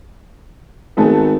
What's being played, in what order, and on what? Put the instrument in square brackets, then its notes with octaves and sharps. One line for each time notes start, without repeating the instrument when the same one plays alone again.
[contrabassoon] G#1 [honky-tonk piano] A3 B3 G#4